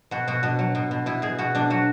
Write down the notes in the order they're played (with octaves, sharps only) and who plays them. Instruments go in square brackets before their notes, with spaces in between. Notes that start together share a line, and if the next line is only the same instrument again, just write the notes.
[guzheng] B2 F#4
B2 F#4
B2 D4
F#3
B2
B2
B2 E4
B2 G#4
B2 F#4
B2 D4
F#3 F#4